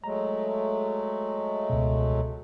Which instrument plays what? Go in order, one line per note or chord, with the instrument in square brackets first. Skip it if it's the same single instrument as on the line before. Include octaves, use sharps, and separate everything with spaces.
[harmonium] F#3 G#3 A3 [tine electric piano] A#5
[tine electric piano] C#2 B2